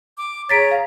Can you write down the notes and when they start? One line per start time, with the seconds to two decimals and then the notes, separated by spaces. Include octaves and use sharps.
0.18 D6
0.49 G#4 C#5 A#5 A6 B6 D7
0.71 F5